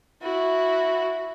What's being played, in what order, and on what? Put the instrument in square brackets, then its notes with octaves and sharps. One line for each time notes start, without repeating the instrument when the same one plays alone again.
[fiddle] E4 F#4